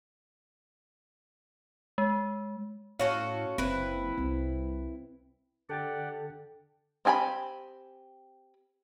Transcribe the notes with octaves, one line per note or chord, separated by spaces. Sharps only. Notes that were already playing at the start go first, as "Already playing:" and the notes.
G#3
A2 C#4 F#4 A4 F5
F#1 C4 E4 B4
C2 C4
D3 G4 A4 D5 F#5 G5 A6
C4 G4 G#5 A#5 B5